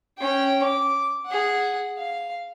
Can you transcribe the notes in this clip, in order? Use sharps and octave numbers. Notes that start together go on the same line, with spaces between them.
C#4 G5
D6
G#4 F#5
F5